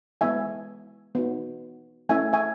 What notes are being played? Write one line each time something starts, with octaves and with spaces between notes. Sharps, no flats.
G#3 B3 E4 E5 G#5
B3 D#4 F#4
A3 C#4 E4 E5 G#5
E5 G#5